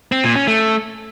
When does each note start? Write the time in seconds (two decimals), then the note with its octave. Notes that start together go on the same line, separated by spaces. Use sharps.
0.12 C4
0.24 A#2
0.36 C#4
0.47 A3